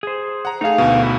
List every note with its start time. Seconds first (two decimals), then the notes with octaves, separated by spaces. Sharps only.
0.03 G#4 C5
0.45 F#5 A#5
0.61 A3 D#4 G#4 F5
0.78 D2 B2
1.03 E4